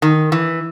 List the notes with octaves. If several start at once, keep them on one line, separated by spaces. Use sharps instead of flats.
D#3
E3